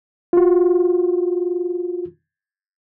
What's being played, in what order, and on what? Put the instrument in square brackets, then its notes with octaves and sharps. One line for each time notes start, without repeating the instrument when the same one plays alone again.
[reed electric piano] F4 F#4